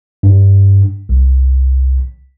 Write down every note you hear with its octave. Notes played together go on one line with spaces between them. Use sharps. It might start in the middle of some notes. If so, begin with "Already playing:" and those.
G2
C2